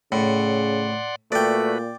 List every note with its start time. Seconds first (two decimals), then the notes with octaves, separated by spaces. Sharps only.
0.12 A2 C#3 D5 F#5 C6
1.32 A#2 A3 F#4 B4 D5 G5